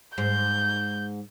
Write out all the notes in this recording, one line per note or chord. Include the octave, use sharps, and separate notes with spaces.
G#2 G6